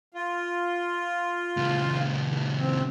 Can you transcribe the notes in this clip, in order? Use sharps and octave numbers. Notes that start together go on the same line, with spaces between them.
F4
C#2 A#2
C4